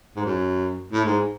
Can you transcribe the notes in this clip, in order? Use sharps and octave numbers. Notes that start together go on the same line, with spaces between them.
G#2
F#2
A2
G#2